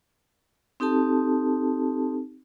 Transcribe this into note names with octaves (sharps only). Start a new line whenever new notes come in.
C4 D#4 G4 A4 A5